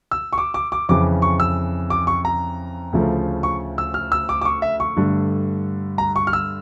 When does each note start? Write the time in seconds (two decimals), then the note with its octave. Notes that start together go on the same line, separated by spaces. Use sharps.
0.11 E6
0.33 C#6
0.38 D6
0.54 D6
0.72 D6
0.89 F2 C#3 E3 D6
1.22 C#6
1.40 E6
1.90 D6
2.07 C#6
2.25 A#5
2.93 D2 C#3 F3 A3
3.43 C#6
3.78 E6
3.94 F6
4.12 E6
4.29 D6
4.42 D6
4.45 C#6
4.62 E5
4.80 C#6
4.97 G2 D3 A3
5.98 A#5
6.16 C#6
6.27 F6
6.33 E6